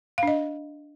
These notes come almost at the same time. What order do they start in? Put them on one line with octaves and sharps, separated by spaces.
F5 D4 D#5